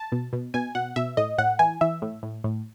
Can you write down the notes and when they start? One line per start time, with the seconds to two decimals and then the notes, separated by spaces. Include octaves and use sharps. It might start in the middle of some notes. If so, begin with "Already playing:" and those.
Already playing: A5
0.12 B2
0.33 B2
0.54 B2 G#5
0.75 B2 F#5
0.96 B2 E5
1.17 A2 D#5
1.38 A2 F#5
1.59 E3 G#5
1.81 E3 E5
2.02 A2
2.23 A2
2.44 A2